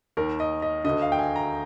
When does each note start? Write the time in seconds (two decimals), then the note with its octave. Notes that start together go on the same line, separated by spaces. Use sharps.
0.17 D#2 D#3 A#4
0.40 D#5
0.62 D#5
0.84 D2 D3 D#5
1.02 F5
1.12 G5
1.19 G#5
1.36 A#5